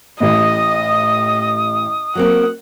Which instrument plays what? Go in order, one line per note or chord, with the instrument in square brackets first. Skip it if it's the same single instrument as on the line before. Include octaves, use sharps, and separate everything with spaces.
[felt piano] A1 A2 [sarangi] D#5 [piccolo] D#6
[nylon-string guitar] F#3 A#3 C4 [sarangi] F#5